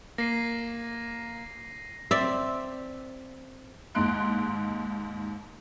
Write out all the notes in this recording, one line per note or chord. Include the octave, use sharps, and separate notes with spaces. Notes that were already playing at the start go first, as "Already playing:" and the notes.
A#3 A#6 C7 D#7
C4 D5 E5
D#2 G#2 D#4 C6 F#6 D7